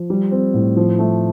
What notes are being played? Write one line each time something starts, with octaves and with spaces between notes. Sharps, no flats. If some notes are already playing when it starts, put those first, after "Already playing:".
Already playing: F3
G3
C4
A2
F3
A3